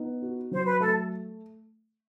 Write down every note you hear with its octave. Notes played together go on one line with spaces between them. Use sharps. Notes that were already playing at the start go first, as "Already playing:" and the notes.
Already playing: B3 D#4
F#4
F#3 C5
B4
A3 A4